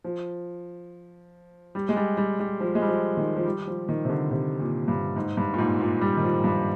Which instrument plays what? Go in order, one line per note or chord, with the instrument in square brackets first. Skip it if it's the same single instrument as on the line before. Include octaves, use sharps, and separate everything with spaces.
[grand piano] F3
G3
G#3
G3
G3
G3
F3
G#3
G3
F3
D#3
F3
G3
F3
D#3
C3
D3
C3
A#2
G2
G#2
G2
A#2
G#2
A#2
G3
D#3
F3
G2